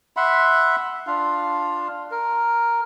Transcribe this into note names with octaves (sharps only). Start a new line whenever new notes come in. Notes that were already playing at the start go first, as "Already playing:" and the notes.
E5 F#5 B5 C6
D4 F4 F5
A#4